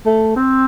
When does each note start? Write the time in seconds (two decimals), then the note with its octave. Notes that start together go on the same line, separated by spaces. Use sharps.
0.06 A3
0.36 C4